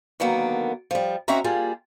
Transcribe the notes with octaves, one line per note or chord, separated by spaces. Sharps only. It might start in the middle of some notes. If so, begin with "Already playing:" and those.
D3 D#3 F#3 A#3 B3
F3 G3
C4 C#4 D#4 F#4 E5 A#5
G3 A#3 F4 G#4